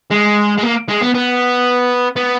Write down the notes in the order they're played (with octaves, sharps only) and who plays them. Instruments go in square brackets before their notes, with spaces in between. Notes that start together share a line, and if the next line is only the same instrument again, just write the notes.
[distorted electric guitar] G#3
G#3
A#3
G#3
B3
B3
B3